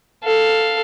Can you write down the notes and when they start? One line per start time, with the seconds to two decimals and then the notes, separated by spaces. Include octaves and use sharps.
0.24 A4 F5